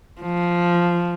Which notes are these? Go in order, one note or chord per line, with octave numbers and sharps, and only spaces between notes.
F3